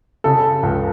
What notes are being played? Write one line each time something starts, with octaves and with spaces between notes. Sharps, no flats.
C#3 A4
C#2